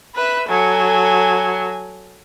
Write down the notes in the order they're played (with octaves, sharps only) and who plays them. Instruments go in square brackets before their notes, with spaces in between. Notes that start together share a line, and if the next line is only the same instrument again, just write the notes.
[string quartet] B4 E5 [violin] B5 F#6
[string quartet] F#3 [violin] A4 G#5